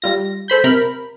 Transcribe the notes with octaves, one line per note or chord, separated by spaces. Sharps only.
G3 F4 A#6
A4 C5 B5 G6
C3 A#4 B5